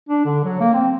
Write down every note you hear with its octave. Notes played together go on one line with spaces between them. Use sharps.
D4
D3
F#3
A#3
C4